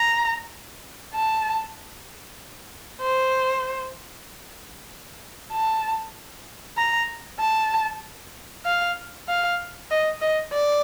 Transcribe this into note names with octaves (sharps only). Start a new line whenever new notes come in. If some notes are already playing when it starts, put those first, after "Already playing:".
Already playing: A#5
A5
C5
A5
A#5
A5
F5
F5
D#5
D#5
D5